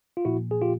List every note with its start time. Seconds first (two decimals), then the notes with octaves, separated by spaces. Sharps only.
0.17 F4
0.25 A#2 F3 A#3 E4 F#4
0.51 G#4
0.61 F4 G4